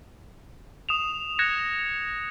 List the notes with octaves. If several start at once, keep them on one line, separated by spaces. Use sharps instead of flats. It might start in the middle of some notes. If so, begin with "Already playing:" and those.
D#6 E7 F7
F#6 G#6 A#6 C#7 E7